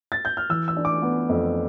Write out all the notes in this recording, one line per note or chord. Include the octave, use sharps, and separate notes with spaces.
A6
G6
F6
E3 E6
E6
D4
D6
B3
F2